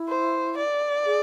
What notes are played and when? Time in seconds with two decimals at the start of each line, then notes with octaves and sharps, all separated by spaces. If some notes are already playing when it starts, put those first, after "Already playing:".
Already playing: E4
0.09 C5
0.58 D5
1.06 G#4